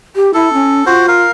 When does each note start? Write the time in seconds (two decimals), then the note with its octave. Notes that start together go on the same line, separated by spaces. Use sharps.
0.16 G4
0.34 E4 A4
0.53 C#4
0.86 F4 F#4 C5
1.08 A#4 F5